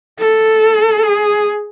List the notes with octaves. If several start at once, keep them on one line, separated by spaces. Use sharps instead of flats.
A4
G#4